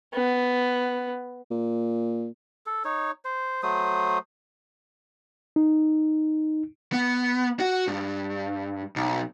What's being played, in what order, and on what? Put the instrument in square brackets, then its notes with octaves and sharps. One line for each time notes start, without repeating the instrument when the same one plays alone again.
[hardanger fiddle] B3
[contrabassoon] A#2
[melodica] A4
D#4 C#5
C5
F#3 A3 C5 D#6
[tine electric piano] D#4
[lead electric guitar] B3
F#4
G2
B1